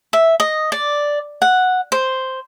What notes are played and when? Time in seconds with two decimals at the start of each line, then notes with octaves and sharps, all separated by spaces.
0.13 E5
0.40 D#5
0.72 D5
1.42 F#5
1.92 C5